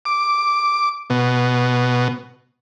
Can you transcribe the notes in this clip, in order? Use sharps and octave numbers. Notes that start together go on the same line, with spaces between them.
D6
B2